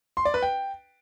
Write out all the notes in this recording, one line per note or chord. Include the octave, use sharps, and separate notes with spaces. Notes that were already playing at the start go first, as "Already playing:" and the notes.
C6
D5
B4
G5